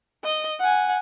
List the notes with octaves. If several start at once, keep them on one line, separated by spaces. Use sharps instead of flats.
D#5
F#5 G#5